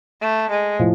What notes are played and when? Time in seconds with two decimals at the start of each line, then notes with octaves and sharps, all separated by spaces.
0.21 A3
0.50 G#3
0.79 A2 F3